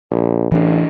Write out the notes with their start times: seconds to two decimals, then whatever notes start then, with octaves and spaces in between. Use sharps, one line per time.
0.11 A#1
0.52 A1 E3 D4